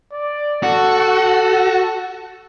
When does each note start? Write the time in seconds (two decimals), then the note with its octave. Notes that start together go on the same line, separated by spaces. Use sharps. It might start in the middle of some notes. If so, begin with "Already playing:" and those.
0.13 D5
0.63 F#4 A4